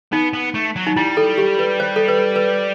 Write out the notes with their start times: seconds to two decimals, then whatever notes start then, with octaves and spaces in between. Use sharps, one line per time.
0.12 B3 D#4
0.33 B3
0.54 A3
0.76 F#3
0.87 D#4
0.96 G3 E4
1.17 A4
1.38 G4
1.59 B4
1.80 C5
1.96 A4
2.08 B4
2.36 B4